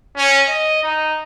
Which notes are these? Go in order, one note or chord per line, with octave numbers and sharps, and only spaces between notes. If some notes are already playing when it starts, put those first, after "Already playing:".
C#4
D#5
D#4